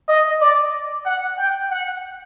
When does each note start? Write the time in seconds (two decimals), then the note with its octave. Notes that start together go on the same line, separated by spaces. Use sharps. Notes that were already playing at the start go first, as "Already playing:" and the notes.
0.08 D#5
0.40 D5
1.05 F#5
1.38 G5
1.71 F#5